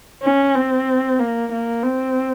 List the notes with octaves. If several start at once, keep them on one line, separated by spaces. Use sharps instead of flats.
C#4
C4
A#3
A#3
C4